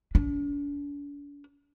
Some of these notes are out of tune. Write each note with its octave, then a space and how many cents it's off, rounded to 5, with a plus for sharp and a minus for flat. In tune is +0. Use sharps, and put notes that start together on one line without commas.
D4 -45